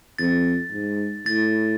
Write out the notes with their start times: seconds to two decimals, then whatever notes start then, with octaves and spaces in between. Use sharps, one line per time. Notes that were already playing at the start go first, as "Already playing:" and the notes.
0.18 F2 A6
0.72 G#2
1.26 A2 A6